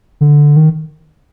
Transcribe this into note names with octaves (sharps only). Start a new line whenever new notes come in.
D3
D#3